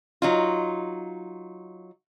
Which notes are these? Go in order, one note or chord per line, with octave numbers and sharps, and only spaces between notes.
F#3 D#4 F4